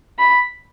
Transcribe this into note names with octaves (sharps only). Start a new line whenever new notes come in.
B5